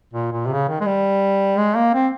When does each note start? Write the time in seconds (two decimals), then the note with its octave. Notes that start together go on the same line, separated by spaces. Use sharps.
0.14 A#2
0.32 A#2
0.46 C3
0.50 C#3
0.68 D#3
0.81 G#3
0.86 G3
1.58 G#3
1.76 A#3
1.94 C4